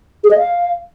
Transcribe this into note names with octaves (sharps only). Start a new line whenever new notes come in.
G#4
D#5
F5